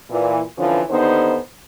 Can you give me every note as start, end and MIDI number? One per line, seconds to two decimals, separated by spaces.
0.11 0.40 46
0.11 0.40 52
0.58 0.81 50
0.58 0.81 52
0.58 0.81 53
0.58 0.81 61
0.58 0.81 71
0.90 1.38 39
0.90 1.38 50
0.90 1.38 59
0.90 1.38 63
0.90 1.38 69
0.90 1.38 72